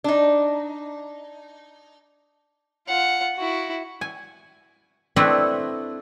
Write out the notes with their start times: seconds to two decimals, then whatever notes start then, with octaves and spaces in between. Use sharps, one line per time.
0.04 D4 D#4
2.88 F4 F#5
3.36 E4 F#4
4.01 G#5
5.16 A3 C4 D4 E4 B4 D#5